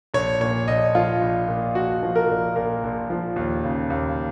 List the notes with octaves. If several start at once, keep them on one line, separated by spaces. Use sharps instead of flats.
A#1 C#5
A#2 C#5
A#1 D#5
F3 F4
A#1
A#2
A#1 F#4
F3
A#4
A#1
A#2 A#4
A#1
F3
D#2
C#3
D#2